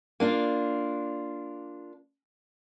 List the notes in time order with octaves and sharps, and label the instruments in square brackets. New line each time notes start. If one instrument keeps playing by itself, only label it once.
[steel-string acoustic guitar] A#3 D4 F4